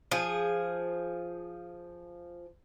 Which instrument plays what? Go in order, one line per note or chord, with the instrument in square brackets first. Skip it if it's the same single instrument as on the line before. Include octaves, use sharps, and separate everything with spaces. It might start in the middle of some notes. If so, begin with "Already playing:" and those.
[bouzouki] F3 G#4